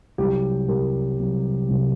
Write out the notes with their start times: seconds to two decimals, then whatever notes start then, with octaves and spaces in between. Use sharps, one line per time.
0.18 C2 C3 F#3 G4
0.68 C2 C3 F#3 G4 A#4
1.19 C2 C3 F#3
1.69 C2 C3 F#3